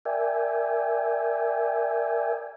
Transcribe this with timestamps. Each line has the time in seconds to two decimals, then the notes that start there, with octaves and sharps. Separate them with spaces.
0.05 A#4 D5 E5 G5 G#5